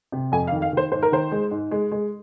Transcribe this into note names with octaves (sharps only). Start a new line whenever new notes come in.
C3
F2 G#5
F5
D#3
F5
D#3 C5
G#2 C5
A#4
D#3 C5
G#3
G#2
G#3
G#3